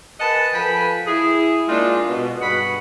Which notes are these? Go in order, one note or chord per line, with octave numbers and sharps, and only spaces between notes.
G#4 A#4 B4 D#5 F#5 A5
F3 A4 B4 G5 G#5 B5
E4 G#4
G#3 A#3 D4 D#4 F4
B2
G2 B3 F#4 G#4 F#5 B5